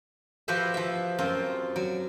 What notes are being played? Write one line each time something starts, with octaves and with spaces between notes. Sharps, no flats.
F3 F#4 G4 B4 C5 E5
F3 E5
F#2 C4 F4
F#3